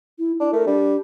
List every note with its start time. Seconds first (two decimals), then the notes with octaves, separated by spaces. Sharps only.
0.19 E4
0.40 D4 E4
0.53 A3 A#4
0.67 G3 D4